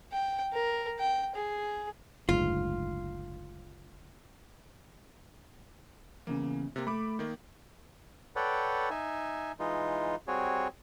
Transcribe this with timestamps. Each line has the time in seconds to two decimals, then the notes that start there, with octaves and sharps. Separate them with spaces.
0.12 G5
0.53 A#4
0.99 G5
1.36 G#4
2.29 F#1 D2 G#2 F4
6.27 E2 C#3 A#3
6.76 C3 A#3
6.87 A3 B5 D6
7.19 D#3 A#3
8.36 A4 B4 C#5 D5 F#5 G5
8.90 D#4 E5 G#5
9.60 E3 G#3 D#4 F4
10.28 G3 C4 F#4 G#4 C#5